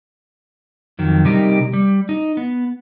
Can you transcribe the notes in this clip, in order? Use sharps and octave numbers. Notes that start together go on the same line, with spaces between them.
F2 D#3 F#3
C3 G3 D#4 G4 A#4
G3
D#4
B3